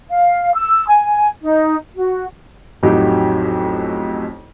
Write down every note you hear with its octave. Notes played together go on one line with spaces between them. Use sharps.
F5
E6
G#5
D#4
F#4
A1 F2 F#3 D#4 G4